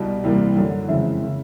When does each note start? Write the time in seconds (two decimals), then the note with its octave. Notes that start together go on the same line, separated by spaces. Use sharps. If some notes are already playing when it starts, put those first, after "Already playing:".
Already playing: C2 B2 G3
0.24 C2 C3 E3 G3 A#3
0.56 F#2 D3 F#3
0.88 F2 C#3 E3 G#3 C4 E5
1.23 C#3